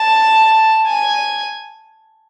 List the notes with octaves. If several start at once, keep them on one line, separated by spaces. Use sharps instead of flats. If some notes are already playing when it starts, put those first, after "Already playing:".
Already playing: A5
G#5